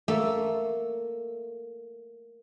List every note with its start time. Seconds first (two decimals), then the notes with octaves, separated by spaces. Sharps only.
0.08 A3 A#3 A4